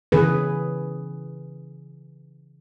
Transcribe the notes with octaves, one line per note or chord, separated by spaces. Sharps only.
C#3 E3 G#4 B4